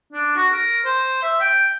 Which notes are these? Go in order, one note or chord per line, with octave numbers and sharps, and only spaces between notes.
D4
F#4
A#4
C5
E5
G5